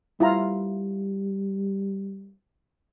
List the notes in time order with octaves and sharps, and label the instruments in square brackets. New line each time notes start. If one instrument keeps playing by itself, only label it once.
[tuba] G3 [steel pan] E4 F4 A#5